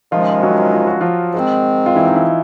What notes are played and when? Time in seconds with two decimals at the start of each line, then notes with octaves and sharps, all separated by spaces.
0.12 C3 D#3 F3 G#3 C#4 F4
0.42 F#3 F#4
0.74 F4
0.87 F#4
1.01 F3 F4
1.34 G#2 D#3 G#3 C4
1.86 F4
1.95 E3 E4
2.07 D#4
2.16 E3 E4